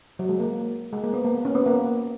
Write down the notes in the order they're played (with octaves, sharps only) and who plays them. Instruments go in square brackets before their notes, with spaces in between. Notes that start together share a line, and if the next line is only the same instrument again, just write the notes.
[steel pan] F#3
G#3
A#3
G#3
A#3
B3
A#3
B3
C#4
B3
A#3